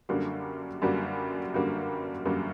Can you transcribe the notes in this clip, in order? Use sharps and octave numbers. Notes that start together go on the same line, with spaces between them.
F#2 D3 G3 A#3 F#4
F#2 D3 G3 A#3 F#4
F#2 D3 G3 A#3 F#4
F#2 D3 G3 A#3 F#4